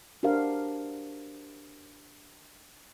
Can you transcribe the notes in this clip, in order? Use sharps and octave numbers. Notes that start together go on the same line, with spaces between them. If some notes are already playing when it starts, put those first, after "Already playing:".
D4 F#4 G4 A#4 C5 F5